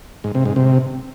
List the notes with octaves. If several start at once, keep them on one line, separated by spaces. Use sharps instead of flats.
G#2
C3
G#2
C3